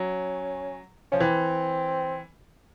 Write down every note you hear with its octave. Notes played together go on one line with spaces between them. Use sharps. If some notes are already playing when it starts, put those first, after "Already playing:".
Already playing: F#3 C#4
F3 C#4
E3 C4